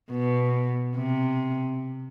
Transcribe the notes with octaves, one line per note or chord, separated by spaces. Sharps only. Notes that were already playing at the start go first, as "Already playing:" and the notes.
B2
C3